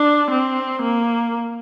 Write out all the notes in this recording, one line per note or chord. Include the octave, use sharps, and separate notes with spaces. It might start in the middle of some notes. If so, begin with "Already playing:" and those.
Already playing: D4
C4
A#3